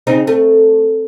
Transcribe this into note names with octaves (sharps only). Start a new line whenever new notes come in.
C#3 C4 D#4
A3